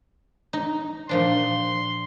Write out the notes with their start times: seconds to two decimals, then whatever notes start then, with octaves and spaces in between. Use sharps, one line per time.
0.53 D#4
1.09 A#2 F3 D4 C6